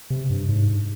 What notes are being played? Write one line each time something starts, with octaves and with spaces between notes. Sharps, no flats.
C3
G2
G#2